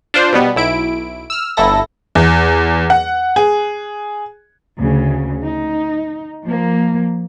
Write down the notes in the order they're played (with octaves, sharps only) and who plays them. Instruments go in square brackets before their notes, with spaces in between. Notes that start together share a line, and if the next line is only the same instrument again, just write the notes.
[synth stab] D4 F4 C5
B2 G3 B3
B1 E4 D7
E6 F6
G1 E4 A4 A#6
[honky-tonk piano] E2
F#5
G#4
[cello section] D2 C#3
D#4
F3 A#3